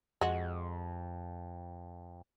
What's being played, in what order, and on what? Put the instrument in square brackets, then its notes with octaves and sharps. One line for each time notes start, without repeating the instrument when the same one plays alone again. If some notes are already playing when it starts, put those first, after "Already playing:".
[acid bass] F2 [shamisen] G#3 F#4